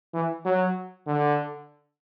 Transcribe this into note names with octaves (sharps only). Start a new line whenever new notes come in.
E3
F#3
D3